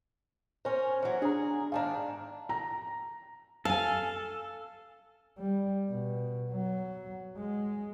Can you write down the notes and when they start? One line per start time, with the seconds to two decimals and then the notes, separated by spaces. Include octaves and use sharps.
0.65 C#4 A#4 C5
1.02 E3 F#3
1.22 D4 G#4 A#5
1.72 G#2 D#3 D4 F5 A5 A#5
2.49 A#5
3.65 A4 F5 G#5 A5
5.38 G3
5.90 B2
6.52 F#3
7.37 G#3